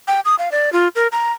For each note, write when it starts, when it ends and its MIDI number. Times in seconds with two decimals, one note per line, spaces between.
0.08 0.20 79
0.25 0.36 87
0.39 0.52 77
0.52 0.72 74
0.73 0.88 65
0.96 1.08 70
1.12 1.32 82